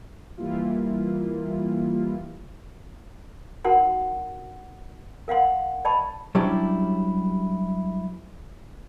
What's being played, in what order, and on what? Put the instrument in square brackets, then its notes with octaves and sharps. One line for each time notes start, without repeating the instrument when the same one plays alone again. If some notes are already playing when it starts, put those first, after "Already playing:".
[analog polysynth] E3 G3 A#3 E4 F4
[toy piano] D#4 F#4 A#4 F#5 C6
A#4 F5 F#5 C6
D5 D#5 A5 B5 C#6
[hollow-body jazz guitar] F#3 G3 C#4 D4 E4 G4